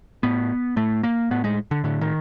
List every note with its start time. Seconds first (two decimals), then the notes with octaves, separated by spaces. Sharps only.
0.23 A2 B3
0.76 A2 A3
1.03 A#3
1.31 A2 B3
1.44 G#3
1.71 D3
1.84 A2 D3
2.01 D#3